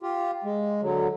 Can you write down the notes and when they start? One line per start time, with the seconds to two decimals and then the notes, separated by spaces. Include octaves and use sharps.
0.03 F4 G4
0.44 G#3
0.82 D3 F#3